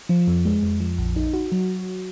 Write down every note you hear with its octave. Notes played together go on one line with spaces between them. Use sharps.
F3
F2
G#3
F2
F3
A#1
D#4
F#4
F#3